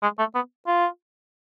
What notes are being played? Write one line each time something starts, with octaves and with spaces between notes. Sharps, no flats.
G#3
A3
B3
F4